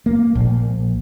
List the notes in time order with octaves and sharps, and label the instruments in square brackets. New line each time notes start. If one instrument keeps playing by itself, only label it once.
[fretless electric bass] A#3
A#1